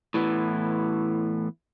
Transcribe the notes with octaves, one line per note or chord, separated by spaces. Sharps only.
A2 E3 B3